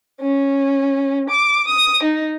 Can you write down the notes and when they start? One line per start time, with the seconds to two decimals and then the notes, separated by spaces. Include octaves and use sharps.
0.20 C#4
1.28 D6
1.66 D#6
2.02 D#4